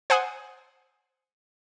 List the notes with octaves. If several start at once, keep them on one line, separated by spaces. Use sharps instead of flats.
C5 F#5 G#5 D#6